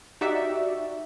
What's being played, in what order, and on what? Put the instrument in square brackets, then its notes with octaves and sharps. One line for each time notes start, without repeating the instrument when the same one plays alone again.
[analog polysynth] D#4 F#4 G4 D5 E5